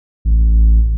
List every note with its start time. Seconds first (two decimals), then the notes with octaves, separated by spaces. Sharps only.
0.25 A1